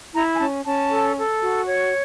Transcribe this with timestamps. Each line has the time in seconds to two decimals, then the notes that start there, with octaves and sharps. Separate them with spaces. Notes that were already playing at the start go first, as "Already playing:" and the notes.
0.14 E4 A#5
0.35 G#5
0.39 C#4 A5
0.65 C#4 A5
0.90 A4
1.16 A4
1.41 F#4
1.67 C#5